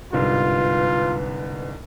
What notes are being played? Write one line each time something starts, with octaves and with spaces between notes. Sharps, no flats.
G1 C2 G#2 F4 B4